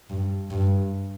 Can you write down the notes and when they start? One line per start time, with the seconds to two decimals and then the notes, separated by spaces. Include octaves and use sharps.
0.10 G2
0.51 G2